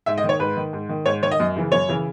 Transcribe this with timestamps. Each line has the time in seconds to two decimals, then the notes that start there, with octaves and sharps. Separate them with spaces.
0.06 G#2 E5
0.18 D#5
0.24 D#3
0.29 C#5
0.39 G#2 B4
0.57 D#3
0.73 G#2
0.89 D#3
1.06 G#2 C#5
1.22 D#3 C#5
1.31 D#5
1.40 F#2
1.56 C#3 E3
1.72 F#2 C#5
1.89 C#3 E3